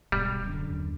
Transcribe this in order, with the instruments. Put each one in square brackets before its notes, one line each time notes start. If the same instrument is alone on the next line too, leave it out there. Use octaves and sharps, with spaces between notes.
[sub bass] D1 [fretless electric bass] B1 G#2 B2 [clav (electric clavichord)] G3
[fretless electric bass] F#2 D3
[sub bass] D#2